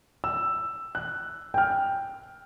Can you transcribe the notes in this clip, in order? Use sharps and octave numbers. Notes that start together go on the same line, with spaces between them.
E6
F#6
G5 F6